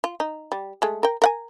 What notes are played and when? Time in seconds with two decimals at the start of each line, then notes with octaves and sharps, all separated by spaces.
0.04 F4
0.20 D#4
0.52 G3
0.82 G#3 A3
1.03 A#4 G5
1.22 A#4 F#5 G#5